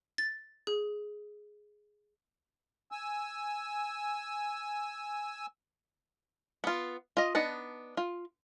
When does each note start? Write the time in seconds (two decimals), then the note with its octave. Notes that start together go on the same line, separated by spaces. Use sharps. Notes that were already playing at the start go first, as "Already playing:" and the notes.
0.18 A6
0.67 G#4
2.92 G#5 E6
6.64 B3 F4
7.17 F4 D#5
7.35 B3 D4 D#4 F#5 A5
7.97 F4